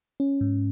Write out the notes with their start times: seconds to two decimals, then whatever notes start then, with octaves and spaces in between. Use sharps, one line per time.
0.20 C#4
0.41 G#2